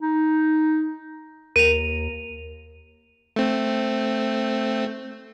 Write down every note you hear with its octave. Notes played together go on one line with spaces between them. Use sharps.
D#4
D#2 A#4 D#7 F7
A3 C4